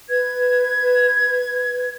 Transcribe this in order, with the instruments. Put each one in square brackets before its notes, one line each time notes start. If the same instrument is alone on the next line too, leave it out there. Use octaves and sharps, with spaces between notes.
[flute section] B4 G#6